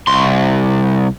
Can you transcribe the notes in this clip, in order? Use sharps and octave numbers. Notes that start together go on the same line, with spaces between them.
C2 C6